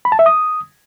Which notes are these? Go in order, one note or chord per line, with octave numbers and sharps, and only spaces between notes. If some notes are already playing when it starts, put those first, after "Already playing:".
B5
A5
E5
D#6